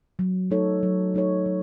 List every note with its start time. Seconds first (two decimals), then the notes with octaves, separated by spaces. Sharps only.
0.19 F#3
0.51 A3 D#4 A4 C#5
0.83 F#3
1.14 A3 D#4 A4 C#5
1.46 F#3